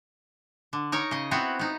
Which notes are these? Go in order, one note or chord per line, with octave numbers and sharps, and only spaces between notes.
D3
D#4 A#4 C#5
C#3 D#5
B3 C4 E4 F#4
B3 D#4